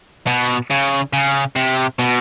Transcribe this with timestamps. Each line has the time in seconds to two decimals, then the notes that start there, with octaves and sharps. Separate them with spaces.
0.27 B2
0.71 C#3
1.13 C#3
1.56 C3
1.99 B2